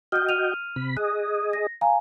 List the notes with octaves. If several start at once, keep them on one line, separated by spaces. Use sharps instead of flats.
F#4 D#5 G5 F6 G6
F6 D#7 F7
C3 B5
G#4 D#5 F#6
A#6
F5 G#5 A#5